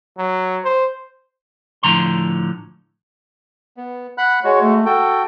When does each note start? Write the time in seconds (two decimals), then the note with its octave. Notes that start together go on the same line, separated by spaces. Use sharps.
0.18 F#3
0.64 C5
1.83 A2 D3 F3 A#5 C6
3.77 B3
4.18 F#5 B5 F#6
4.44 G#3 F#4 C#5
4.61 A3
4.86 F#4 A4 G5